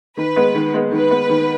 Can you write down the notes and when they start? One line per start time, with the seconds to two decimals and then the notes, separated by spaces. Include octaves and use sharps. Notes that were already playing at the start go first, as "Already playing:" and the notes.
0.17 D#3 B4
0.36 G#3 B3
0.55 D#3
0.74 G#3 B3
0.92 D#3 B4
1.11 G#3 B3
1.30 D#3